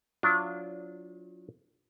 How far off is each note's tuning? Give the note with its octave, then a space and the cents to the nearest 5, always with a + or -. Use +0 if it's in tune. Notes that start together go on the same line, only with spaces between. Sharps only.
F#3 -40 D4 -25 F4 -30